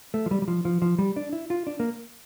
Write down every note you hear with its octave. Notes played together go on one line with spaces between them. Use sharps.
A3
F3
G3
G3
F3
F3
F3
G3
D4
E4
F4
D4
A#3